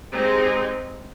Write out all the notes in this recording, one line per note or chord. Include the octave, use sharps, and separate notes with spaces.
G#3 C4 D#4 G4